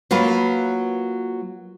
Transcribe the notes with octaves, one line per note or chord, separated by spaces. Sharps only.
F#3 A#3 F4 B4